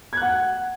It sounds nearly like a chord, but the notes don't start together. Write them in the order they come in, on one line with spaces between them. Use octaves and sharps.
G#6 F#6 F#5